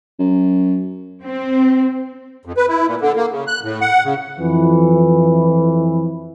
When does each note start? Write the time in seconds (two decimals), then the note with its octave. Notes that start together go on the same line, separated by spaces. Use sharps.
0.19 F#2
1.24 C4
2.45 F2
2.57 B4
2.68 E4
2.86 A#2
3.01 D3
3.16 A#3
3.31 C#3
3.47 F#6
3.63 A2
3.81 F#5
4.04 C#3
4.38 F2 E3